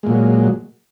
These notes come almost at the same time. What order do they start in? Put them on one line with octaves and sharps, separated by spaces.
G#3 A#2 F#3